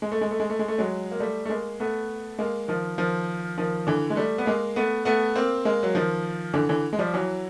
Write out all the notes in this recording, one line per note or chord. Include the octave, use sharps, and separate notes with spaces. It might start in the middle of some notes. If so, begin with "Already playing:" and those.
G#3
A3
G#3
A3
G#3
A3
G#3
A3
F#3 G#3
A#3
G3 A3
A3
G#3 A#3
A3 B3
G#3 A#3
D#3 F3
D#3 F3
D#3 F3
D3 E3
G#3
G3 A3
B3
G#3 A#3
A3 B3
A3 B3
A#3 C4
G#3 A#3
F#3
D#3 F3
D3 E3
D3 E3
G#3
F3 G3
E3 F#3